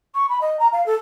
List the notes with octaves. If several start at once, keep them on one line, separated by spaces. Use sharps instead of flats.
C#6
B5
D#5
A#5
F5
A4